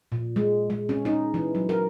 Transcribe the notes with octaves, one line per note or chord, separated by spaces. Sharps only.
A#2
G#3
G#3
C#4
D#4
E3
F#3
A#4